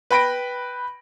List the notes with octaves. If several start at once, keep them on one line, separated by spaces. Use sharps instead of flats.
B4 G5 B5 A#6 D7